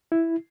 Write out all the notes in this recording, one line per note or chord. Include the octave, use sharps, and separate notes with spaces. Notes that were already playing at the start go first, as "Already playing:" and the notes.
E4